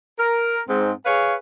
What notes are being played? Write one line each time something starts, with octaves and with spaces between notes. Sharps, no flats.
A#4
G#2 C4
G#4 B4 C#5 F5